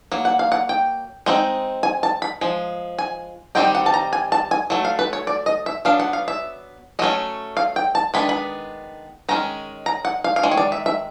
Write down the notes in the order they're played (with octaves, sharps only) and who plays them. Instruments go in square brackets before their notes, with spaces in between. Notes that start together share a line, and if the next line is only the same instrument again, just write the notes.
[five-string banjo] F#3 A#3
F#5
F5
F#5
G5
G#3 C4 D#4
G#5
A5
B5
F3 G#3
G#5
D#3 G3 C4 D#4 G5
F#5
A5
A#5
G#5
A5
G#5
F#3 A3
F5
B4
C#5
D5
D#5
E5
F#3 B3 D4 F5
F#5
F5
E5
F#3 A3 C#4 D#5
F5
G5
A5
D#3 G#3 B3 D4 B5
B5
D#3 G#3 C#4 A#5
A#5
F#5
F5
F5
D#3 G#3
C#5
D5
E5
E5